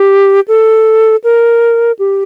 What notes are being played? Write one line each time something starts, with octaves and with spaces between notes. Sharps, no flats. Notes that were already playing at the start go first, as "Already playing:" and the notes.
Already playing: G4
A4
A#4
G4